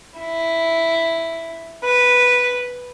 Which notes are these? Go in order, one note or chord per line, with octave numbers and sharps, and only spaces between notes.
E4
B4